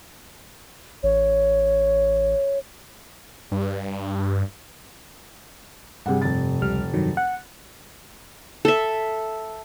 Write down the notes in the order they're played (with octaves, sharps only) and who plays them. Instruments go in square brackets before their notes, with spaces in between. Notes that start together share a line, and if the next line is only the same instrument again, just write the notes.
[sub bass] A1 [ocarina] C#5
[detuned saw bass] G2
[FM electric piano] G2 C3 [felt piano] G3 G#4 F#5
[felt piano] F1 A6
[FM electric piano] C#2 G3 F6
G2 D#3 F#3
F#5
[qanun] A4 E5